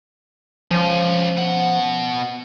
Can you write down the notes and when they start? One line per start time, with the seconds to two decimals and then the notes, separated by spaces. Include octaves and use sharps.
0.71 F3 C#4 F4
1.37 B2 F#5